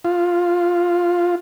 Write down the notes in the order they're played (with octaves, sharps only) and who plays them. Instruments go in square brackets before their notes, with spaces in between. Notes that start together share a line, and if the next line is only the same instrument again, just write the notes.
[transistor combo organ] F4